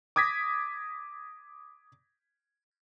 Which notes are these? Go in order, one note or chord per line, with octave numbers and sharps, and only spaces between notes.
D6 D#6 G#6 A#6 B6